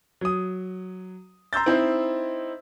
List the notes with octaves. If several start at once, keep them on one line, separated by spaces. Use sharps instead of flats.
F#3 D#6
A#5 C6 E6 G6 A6
C4 D#4 E4 C5